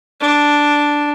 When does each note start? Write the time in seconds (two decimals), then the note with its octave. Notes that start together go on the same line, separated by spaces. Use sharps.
0.21 D4